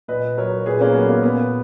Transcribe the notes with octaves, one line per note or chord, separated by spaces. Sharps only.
A#2 B4 D#5
F#3 A#4 C#5
A#2 G#4 B4
A#3 C#4
F#3 B3
A#3
A#2 B3